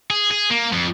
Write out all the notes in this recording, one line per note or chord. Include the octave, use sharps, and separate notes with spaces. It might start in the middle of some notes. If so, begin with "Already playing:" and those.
G#4
G#4
A#3
F2